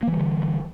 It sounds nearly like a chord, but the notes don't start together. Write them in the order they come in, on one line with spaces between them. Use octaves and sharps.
A#3 E3 G3 D3